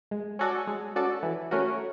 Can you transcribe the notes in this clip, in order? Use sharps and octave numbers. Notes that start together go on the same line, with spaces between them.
G#3
C#4 F#4 A4 D5
G#3
C#4 F#4 A4 D5
E3
A3 C#4 F#4 A#4